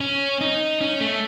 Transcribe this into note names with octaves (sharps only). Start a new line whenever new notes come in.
C#4
D#4
C#4
A3